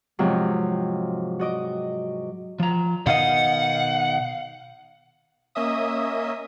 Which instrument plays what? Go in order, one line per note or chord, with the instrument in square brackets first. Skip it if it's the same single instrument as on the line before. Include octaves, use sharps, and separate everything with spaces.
[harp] G#2 C3 F3 F#3
F#4 D#5 D6
[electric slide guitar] F3 A#5
[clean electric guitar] B2 D#3 D#5 [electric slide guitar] F5 [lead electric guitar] F#5
[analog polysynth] A#3 C#4 D#5 E5 D#6